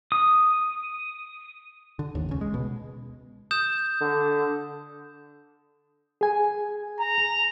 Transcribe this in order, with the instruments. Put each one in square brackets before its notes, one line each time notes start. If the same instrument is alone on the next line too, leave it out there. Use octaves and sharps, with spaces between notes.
[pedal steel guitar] D#6
[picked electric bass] D3
A1 D#2
C#2 C#3
G#3
B2
[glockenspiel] D#6 G6 E7
[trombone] D3
[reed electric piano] G#4 G#5
[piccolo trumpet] A#5